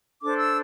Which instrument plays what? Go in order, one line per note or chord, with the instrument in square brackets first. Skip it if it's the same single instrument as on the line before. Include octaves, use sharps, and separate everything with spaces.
[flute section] D4 A4 C5 D6
E6